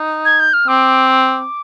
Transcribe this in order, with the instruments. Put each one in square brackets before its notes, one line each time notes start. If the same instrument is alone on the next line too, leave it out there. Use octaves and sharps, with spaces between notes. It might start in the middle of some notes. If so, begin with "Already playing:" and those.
Already playing: [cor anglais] D#4
[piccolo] G#6
G6
F6
[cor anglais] C4 [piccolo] D6
[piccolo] D6